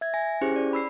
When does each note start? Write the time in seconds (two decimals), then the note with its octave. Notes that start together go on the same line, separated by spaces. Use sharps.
0.01 E5 G#6
0.14 G#5 A#6
0.41 C#4 E4 G4 G#4 C5
0.56 D5
0.73 B5 E6 C7